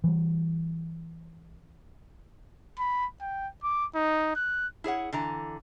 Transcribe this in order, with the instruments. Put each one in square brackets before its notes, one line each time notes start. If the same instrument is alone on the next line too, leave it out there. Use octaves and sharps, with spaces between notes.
[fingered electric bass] E3 G3
[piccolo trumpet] B5
G5
D6
D#4
F#6
[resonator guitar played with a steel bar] E4 G#4 C#5 F#5
D3 E3 A#5